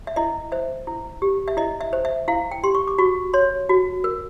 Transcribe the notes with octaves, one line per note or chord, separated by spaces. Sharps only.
E5
E4 D#5
C5 E5
E4
G4
E5
E4 D#5
E5
C5
E5
E4 F5
G5
G4 C6
C#6
D6
F#4 C#6
C#5 C6
F#4
A#4